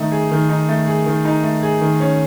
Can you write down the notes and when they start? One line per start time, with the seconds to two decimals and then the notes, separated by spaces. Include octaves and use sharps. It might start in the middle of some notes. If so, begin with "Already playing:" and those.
Already playing: D#3 A3 D#4
0.12 G#4
0.31 D#3
0.49 D#4
0.69 A3
0.88 G#4
1.06 D#3
1.25 D#4
1.44 A3
1.63 G#4
1.81 D#3
2.00 C#4